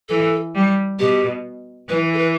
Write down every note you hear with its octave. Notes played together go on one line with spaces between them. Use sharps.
E3 A4
G3
B2 G4
E3 B4
A4
B4